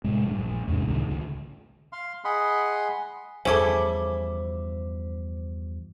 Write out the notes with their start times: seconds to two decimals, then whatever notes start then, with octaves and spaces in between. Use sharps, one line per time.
0.04 A2 C3 G#3
0.26 A1 G2
0.39 A#1
0.68 E2 G#2 C3 D4
0.87 C#2 A2 C3 D#3
1.09 C#2 D3
1.92 F5 C6
2.24 G#4 D#5 F#5 B5 C6
3.45 E2 G2 C#3 F3 E4 A4 C5 D6